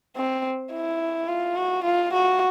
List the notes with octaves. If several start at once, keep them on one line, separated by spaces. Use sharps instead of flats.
C4
E4
F4
F#4
F4
F#4